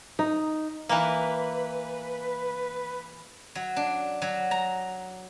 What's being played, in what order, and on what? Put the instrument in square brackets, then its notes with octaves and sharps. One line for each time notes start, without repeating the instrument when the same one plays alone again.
[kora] D#4
[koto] E3 A#3 [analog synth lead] B4
[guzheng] F#3
D4
F#3
A#5